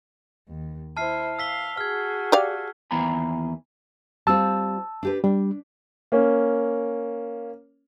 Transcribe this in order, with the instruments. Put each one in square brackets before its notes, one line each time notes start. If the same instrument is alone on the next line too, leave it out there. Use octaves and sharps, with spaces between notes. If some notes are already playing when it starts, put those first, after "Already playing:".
[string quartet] D#2
[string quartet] E4 C5 [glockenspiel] A5 F6 C7
[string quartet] F5 [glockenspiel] E6 B6 G7
[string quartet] F#4 G#4 [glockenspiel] F6 G#6
[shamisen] G4 D5 F5
[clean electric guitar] D#2 E3 B3 G#5 A#5 B5
[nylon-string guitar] G3 C4 F4 [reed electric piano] A5 E6
[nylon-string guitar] D4 G4 B4
[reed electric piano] G3 [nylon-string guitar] D4
[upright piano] A#3 C#4